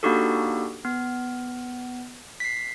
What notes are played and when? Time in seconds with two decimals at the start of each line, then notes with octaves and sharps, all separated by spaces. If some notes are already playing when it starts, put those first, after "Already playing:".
0.03 A#3 D4 D#4 F#4 G4 A4
0.85 B3
2.40 B6 C7